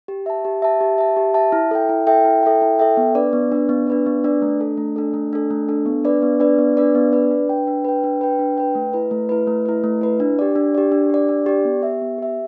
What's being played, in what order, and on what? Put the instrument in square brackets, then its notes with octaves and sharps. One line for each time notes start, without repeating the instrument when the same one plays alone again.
[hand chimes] G4
E5 A5
G4
E5 A5
G4
E5 A5
G4
E5 A5
E4
A4 E5 G5
E4
A4 E5 G5
E4
A4 E5 G5
E4
A4 E5 G5
B3
D4 B4 D5
B3
D4 B4 D5
B3
D4 B4 D5
B3
D4 B4 D5
A3
D4 A4
A3
D4 A4
A3
D4 A4
A3
D4 A4
B3
D4 B4 D5
B3
D4 B4 D5
B3
D4 B4 D5
B3
D4 B4 D5
D4
B4 G5
D4
B4 G5
D4
B4 G5
D4
B4 G5
A3
E4 B4
A3
E4 B4
A3
E4 B4
A3
E4 B4
D4
G4 D5
D4
G4 D5
D4
G4 D5
D4
G4 D5
B3
G4 E5
B3
G4 E5